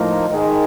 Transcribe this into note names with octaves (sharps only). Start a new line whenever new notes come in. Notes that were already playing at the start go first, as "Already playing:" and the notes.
Already playing: A2 F3 A#3 D#4
G#2 D#3 G#3